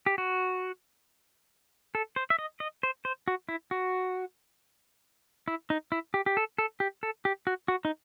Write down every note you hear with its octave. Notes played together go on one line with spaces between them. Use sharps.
G4
F#4
A4
C5
E5
D#5
D#5
C5
C5
F#4
E4
F#4
E4
D#4
E4
G4
G4
A4
A4
G4
A4
G4
F#4
F#4
D#4